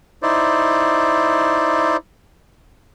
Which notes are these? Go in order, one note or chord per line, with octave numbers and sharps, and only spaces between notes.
D#4 E4 C5 D5